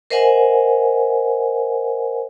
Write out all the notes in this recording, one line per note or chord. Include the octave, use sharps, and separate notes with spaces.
A#4 C5 D#5 E5 F#5 G#5